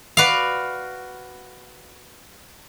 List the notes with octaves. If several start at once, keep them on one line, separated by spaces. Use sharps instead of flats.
F#4 B4 D5 F5